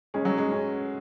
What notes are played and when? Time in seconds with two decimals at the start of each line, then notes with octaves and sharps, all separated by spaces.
0.14 G#3 C#4
0.25 F#3
0.38 G#3
0.51 C#4